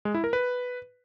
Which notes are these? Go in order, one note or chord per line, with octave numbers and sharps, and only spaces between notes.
G#3
E4
A#4
B4